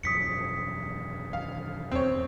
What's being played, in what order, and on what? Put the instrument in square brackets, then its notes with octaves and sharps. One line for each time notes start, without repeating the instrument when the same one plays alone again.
[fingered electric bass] E1 F#2 [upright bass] F4 [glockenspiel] D#6 B6 C#7
[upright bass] D#3 [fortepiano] F5
[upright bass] E2 [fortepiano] C4 C#5